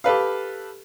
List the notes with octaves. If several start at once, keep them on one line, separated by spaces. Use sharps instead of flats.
G4 A4 B4 F5